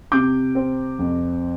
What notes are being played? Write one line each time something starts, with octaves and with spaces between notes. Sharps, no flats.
C3 D6 G6
C4
F2